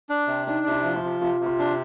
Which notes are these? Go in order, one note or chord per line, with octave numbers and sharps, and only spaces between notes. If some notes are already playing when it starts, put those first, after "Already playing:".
D4
C3
D4 D#4
C3
E4
F3
F4
C3
C3 F4
C3
F4
D4